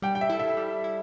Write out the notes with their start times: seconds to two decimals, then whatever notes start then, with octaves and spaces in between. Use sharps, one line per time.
0.02 G3 G5
0.15 G5
0.21 E5
0.30 E4 A4
0.40 E5
0.57 G3
0.84 E4